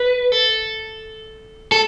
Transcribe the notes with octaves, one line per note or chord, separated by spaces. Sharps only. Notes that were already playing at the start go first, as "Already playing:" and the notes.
Already playing: B4
A4
A4